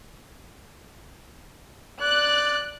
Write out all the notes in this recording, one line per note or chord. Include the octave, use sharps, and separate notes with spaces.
D5 F#6